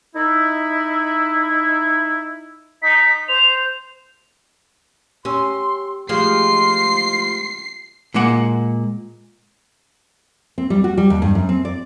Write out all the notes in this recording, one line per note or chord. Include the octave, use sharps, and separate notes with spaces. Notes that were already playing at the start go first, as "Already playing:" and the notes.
D#4 E4
D#4 B6
C5 F7
C#4 G4 C6 E6
F3 G#3 A3 G4 C6 C7
A#2 G#3 A#3 F#5
C4
G3
F#4
G3
D#2
G2
F#2
C4
D5